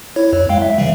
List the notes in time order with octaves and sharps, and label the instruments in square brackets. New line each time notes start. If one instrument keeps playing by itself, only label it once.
[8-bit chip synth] E4 C#5
F2
G#3 F5 G5
E5
C#3 E3 G3